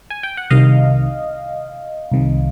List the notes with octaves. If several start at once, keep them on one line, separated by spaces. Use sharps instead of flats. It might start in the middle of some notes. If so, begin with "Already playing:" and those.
G#5
G5
F#5
C2 C3 D#3 D#5 F5
C2 C3 D#3